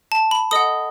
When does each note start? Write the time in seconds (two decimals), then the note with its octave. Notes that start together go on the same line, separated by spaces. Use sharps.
0.12 A5
0.31 B5
0.51 A4 D#5 F#5 D#6